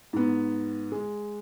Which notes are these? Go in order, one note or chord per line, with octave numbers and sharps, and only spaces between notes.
G#2 B3
G#3